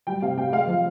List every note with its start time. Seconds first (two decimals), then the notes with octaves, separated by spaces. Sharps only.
0.07 G3 G5
0.22 C3 F5
0.37 C3 G5
0.52 G#3 F5
0.67 F3